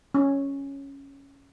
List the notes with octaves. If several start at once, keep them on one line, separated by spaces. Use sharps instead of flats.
C#4